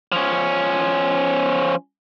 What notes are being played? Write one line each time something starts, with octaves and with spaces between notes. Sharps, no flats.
F3 C#4